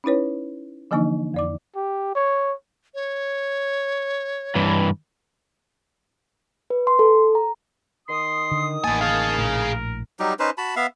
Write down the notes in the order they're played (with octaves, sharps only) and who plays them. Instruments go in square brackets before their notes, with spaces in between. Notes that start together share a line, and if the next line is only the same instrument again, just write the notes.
[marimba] C#4 D#4 E4 B4 C#5
D3 E3 F3 A#3 D4 D#4
F2 D5 D6
[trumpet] G4
C#5
[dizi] C#5
[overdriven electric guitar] G2 E3
[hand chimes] B4
C6
A4
A#5
[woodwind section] D#3 D#6 [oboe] C6
[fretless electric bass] D3
[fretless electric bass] A1 A#3 [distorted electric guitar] B3 G#5 [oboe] A5
[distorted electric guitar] G#4 F5 [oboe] A5
[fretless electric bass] A#1 A2 [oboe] A#4
[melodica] F#3 G3 D#4 G4
C#4 D#4 B4 C5
F#4 A5 B5
B3 E5 F5